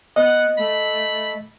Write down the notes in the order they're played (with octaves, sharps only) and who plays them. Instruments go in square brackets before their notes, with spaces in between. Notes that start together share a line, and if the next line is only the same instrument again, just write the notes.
[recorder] B3 [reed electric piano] D#5 [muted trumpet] F#5
[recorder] A3 [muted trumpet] B5